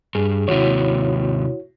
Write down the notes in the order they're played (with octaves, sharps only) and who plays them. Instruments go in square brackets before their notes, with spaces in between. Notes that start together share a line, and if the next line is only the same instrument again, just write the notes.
[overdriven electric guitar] G2 [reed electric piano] G#4
[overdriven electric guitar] D#2 C3 [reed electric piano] E4 F#4 C#5